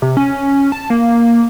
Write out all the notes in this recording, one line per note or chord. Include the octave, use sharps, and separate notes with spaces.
C3
C#4
A5
A#3